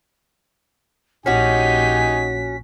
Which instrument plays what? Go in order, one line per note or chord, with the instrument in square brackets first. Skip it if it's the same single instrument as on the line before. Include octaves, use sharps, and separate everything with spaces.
[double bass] A#1 [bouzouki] C#4 F#4 [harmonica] D#4 G4 G#5 [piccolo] B6